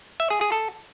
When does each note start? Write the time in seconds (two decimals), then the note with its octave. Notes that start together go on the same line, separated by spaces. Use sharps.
0.20 E5
0.30 G#4
0.41 G#4
0.52 A4